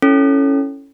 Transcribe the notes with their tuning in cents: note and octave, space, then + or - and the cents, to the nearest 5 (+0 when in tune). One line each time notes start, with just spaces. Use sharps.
C#4 +0 E4 +0 A4 +0